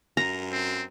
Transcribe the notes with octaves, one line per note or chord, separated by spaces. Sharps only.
F#2 A#5
C4